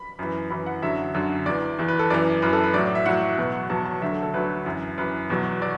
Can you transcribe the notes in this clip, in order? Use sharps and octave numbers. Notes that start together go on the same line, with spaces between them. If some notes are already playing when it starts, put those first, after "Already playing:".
Already playing: B5
F#2 E3
F#2 E3 B5
F#5
F#2 D3 F#3 E5
F#2 D3 F#3
E2 E3 D5
E2 E3
B4
A4
F#2 E3 D5
F#2 E3 B4
A4
B4
A2 F#3 D5
D5
E5
A2 F#3 F#5
E2 B2 F#3
E2 B2 F#3 A5
A5
D2 D3 F#3 E5
A4
A4
D2 D3 F#3 B4
F#2 E3
F#2 E3 B4
E2 B2 F#3
F#3 D5